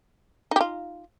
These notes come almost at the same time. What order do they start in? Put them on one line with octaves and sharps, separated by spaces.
D#4 G4 F4